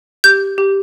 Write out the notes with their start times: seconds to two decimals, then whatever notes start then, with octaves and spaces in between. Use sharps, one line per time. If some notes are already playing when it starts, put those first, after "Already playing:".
0.24 G4 G6
0.58 G4